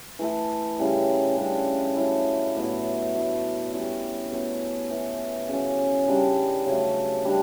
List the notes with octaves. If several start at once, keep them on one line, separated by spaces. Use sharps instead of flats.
E3 A3 E4 A4
C#3 E3 G3
C#3 G3 D4
F#3 A3 E4
A2 F#3 B3 E4
F#3 A3 D4
G3 C#4 E4
B2 A3 C#4
E3 B3 F#4
C#3 F#3 C#4
C#3 G3 D4
C#3 F#3 A3
G3 D4